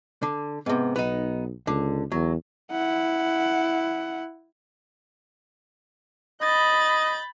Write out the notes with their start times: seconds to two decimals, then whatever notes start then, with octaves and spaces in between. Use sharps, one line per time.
0.23 D3
0.66 G#2 C3 B3
0.96 B1 B3 D#4
1.67 C#2 D3
2.12 E2 F#3
2.72 E4 F#5
6.42 D#5 B5 G6 A6